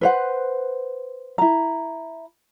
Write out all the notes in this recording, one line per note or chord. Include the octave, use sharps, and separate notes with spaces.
B4 C5 F#5
E4 A#5